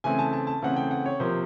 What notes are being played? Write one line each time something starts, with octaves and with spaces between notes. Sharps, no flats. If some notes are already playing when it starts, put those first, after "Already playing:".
C#3 E3 A3 C4 G#5
A5
A5
A5
C#3 E3 A3 C4 F#5
G5
F#5
C#5
C3 F3 A#3 C5